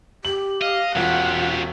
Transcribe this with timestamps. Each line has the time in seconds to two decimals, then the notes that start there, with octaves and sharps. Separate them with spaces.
0.25 G4 F#7
0.61 D#5 F5
0.96 E1 C#4 F4 G4 F#5